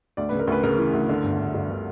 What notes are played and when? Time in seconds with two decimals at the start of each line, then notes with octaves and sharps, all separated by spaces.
0.17 D2 D5
0.29 C#3 B4
0.39 A#4
0.47 D2 B4
0.63 C#3 A#4
0.79 E3
0.93 D2
1.09 D3
1.23 G1
1.39 G1
1.54 G2
1.70 D3